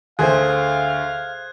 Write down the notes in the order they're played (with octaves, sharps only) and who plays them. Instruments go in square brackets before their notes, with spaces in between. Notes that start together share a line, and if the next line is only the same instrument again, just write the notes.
[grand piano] D2 D3 [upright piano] G#4 C5 [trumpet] F5 [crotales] F#6 G#6